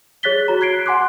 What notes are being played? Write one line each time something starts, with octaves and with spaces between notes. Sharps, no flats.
G#4 C#5 F#6 A6 B6 G7
F#4 A#5
F#6 G#6 C7 D7
F#5 G#5 C6 D6 F#6